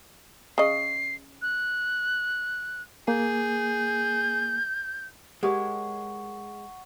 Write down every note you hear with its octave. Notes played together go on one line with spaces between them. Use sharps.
C#3 D#5 C7
F#6
A#3 G#4 G6
G#3 G4 A#4 C#5 F#5 C#6